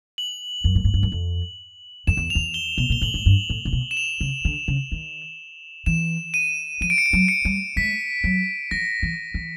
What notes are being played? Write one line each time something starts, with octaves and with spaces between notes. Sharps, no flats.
F#7
F#2
A2
G#2
G2
F#2
F2
F2 E7
E2
E2 F7
G7
B2 G7
A#2 G7
A2 F#7
G#2
G2
A2
C3
B2
E7
F7
C#3
D3
C#3
D#3
E3 E7
D#7
F3 D#7
D7
C#7
D7
F#3
C#7
G3
G#3 B6
F#3
F3 A#6
E3
E3